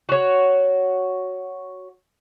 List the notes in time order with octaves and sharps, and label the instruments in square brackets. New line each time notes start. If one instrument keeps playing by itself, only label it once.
[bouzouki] F#4 C#5